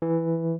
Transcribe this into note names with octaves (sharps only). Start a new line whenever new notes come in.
E3